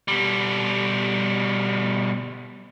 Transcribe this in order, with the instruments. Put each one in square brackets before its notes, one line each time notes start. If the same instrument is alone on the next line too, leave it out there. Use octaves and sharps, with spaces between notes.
[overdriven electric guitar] B2 G3